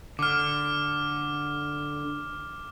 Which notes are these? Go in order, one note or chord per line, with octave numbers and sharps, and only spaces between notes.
D3 D6 F6